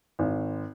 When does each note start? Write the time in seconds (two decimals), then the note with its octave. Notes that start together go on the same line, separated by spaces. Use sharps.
0.19 G#1